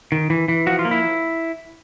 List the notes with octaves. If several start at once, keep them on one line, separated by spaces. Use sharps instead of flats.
D#3
E3
E3
F3 F#4
F4
A#3
E4